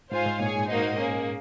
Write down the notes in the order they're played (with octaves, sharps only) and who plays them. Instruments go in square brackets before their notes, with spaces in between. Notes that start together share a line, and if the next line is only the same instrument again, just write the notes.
[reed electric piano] G#2 [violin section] F4 C5 F5 G#5
[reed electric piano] G#2
[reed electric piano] A#2 [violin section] G#4 C#5 G#5
[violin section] A#3 D#4 F#4 C5 D#5
A#3 C#4 G#4